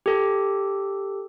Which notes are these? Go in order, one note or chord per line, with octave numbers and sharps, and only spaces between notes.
G4 A4